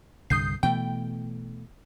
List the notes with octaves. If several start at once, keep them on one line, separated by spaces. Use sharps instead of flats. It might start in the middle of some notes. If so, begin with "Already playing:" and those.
C2 G2 D3 D#6 G6 C7
B2 E3 A3 G5